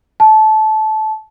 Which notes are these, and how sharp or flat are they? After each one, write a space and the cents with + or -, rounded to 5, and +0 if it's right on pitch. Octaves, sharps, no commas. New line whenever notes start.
A5 -20